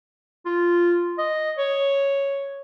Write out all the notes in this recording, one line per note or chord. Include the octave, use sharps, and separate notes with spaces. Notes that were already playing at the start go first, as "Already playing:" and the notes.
F4
D#5
C#5